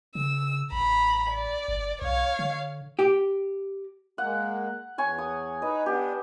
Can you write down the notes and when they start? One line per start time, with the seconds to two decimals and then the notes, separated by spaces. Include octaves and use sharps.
0.15 C#3 E6
0.72 A1 A#5 B5
1.30 D5
1.68 G1
2.02 B1 C#5 F5
2.39 D3
2.99 G4
4.18 G#3 A#3 F#5
4.98 E2 C#5 G#5 C#6
5.18 D#6
5.62 D#4 B4 D#5
5.86 B3 D4 G4